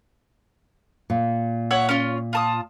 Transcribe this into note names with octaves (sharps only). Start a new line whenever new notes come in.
A#2
C#5 E5 F#5
C#4 F4
F4 A5 D#6